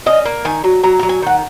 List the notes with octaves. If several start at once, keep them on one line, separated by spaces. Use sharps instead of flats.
C#4 D#5
A#3
D#3 G#5
F#3
F#3 A#5
F#3 A#5
G#5
D#3 F#5